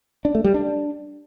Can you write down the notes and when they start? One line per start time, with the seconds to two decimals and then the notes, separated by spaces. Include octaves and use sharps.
0.25 D4
0.35 A3
0.44 G3
0.54 D4